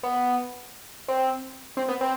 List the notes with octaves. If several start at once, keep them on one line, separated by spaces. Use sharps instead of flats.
B3
C4
C4
B3
C4